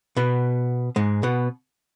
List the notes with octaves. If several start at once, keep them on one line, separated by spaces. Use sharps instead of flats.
B2 B3
G#2 G#3
B2 B3